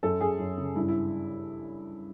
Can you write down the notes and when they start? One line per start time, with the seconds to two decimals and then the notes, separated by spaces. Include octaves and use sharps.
0.03 F#2 A4
0.21 F#2 G#4
0.39 F#2
0.57 C#3
0.75 G2 E4
0.88 E4